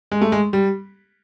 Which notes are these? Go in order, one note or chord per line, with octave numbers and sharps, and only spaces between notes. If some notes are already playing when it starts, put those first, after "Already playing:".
G#3
A3
G#3
G3